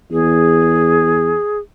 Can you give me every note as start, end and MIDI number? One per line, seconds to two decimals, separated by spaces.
0.12 1.35 40
0.12 1.59 68